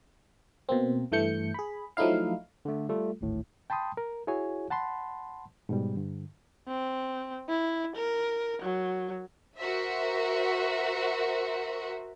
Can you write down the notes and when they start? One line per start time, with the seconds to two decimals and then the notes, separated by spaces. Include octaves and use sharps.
0.69 B2 A#3 C4
1.12 G2 E3 A3 G6 C#7
1.54 G#4 B5
1.97 F3 F#3 A3 D#4 E4 F5
2.65 D3 A3
2.89 G3 A3 F4 A4
3.21 G#1 D2 A2
3.70 G5 A5 B5 C6 D#6
3.97 A#4
4.27 E4 F#4 G#4 C#5 G#5
4.70 F#5 A5 B5 C6
5.69 G#2 B2 G3
5.96 G2 D3
6.68 C4
7.49 E4
7.96 A#4
8.62 F#3
9.57 F#4 A#4 C5 E5